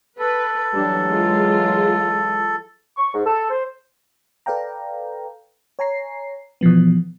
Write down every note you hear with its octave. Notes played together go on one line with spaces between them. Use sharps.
A4 B4
E3 F#3 G3 D4 G4
G#3 F4
C#6
G#2
A4
C5
A4 B4 D5 F5 G5 A#5
C#5 G#5 A#5 C7
B2 E3 F3 B3